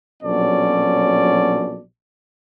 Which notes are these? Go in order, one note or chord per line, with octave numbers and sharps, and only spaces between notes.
A#1 B2 F#3 C#4 A4 D5